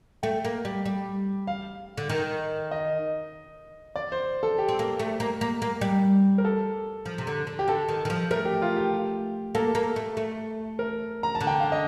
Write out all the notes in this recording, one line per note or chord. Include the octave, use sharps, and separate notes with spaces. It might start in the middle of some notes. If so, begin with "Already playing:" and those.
A3 G5
A#3
G3
G3
F5
D3
D#3
D#5
D5
C5
A4
G4
C4
A#3
A3
A#3
A#3
A#3
G3
A#4
A4
F3
C3
D3
D3
G4
D3 A4
D#3
D#3
F3
A3 A#4
G4
F4
G4
A#3 A4
A#3
A3
A3
A#4
A#5
A5
D3
G5
F5
D#5